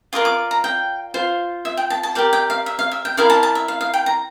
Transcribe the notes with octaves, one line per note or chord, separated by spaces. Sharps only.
F4 A#4 D5 D6
D6
A#5
G5
F4 C5
E5
G5
A5
A5
G4 A#4 D5 G5
G5
F5
E5
F5
E5
G5
E4 A#4 D5 F5
A5
A5
E5
F5
F5
G5
A#5